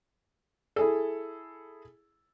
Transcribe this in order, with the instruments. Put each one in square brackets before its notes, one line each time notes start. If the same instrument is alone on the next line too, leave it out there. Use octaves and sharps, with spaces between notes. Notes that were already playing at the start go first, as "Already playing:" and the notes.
[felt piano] E4 G#4 A4